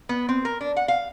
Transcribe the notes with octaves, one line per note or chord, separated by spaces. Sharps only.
B3
C4
A#4
D4
F#5
F5